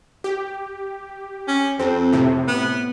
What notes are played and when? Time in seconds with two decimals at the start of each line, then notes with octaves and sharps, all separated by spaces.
0.24 G4
1.48 C#4
1.79 F2 C4
2.12 A2 C3
2.47 B3